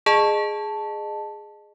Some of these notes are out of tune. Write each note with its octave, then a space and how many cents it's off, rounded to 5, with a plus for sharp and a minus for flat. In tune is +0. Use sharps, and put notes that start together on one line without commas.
G#4 +0 D#5 -30 A5 +0